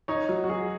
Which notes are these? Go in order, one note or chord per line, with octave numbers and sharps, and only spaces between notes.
D#4 C#5
F#3
F#4
F#3 G#4